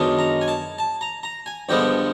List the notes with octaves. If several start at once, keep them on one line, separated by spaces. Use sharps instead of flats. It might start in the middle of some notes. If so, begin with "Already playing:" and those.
Already playing: F#2 D#3 G#3 B3 D4
A#5
G#5
A5
A5
A#5
A#5
G#5
G2 D3 F3 G#3 B3 G5